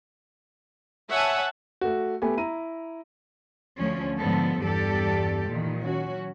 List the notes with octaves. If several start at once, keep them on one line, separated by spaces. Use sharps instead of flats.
C#5 E5 F#5 G#5 A5
A3 F#4
A3 B3 G4 G#5
E4 A#5 D#7
D2 F3 A3 C#4
G#2 D3 F3 B3 A4
E2 G2 G4 A4 D5
A#2 D#3 E3
F#3 C#4 F#4